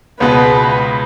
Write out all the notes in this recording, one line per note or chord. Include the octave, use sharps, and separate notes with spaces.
C#2 B2 G#3 B3 B4